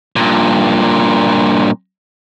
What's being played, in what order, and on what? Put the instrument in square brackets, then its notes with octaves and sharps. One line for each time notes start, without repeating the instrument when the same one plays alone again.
[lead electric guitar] G2 A#2